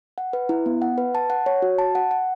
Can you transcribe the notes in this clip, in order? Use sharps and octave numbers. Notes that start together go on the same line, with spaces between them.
F#5
B4
E4
B3
F#5
B4
A5
F#5
C#5
F#4
A5
F#5
F#5